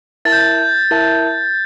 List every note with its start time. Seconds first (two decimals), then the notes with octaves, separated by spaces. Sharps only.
0.25 E4 A#4 E5 A5 A6
0.32 G6
0.41 A6
0.91 E4 A#4 E5 A5